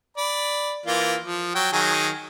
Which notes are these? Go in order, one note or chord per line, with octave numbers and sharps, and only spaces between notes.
D5 B5
E3 A#3 F4
F3
F#3 G5
D#3 F#3 G#4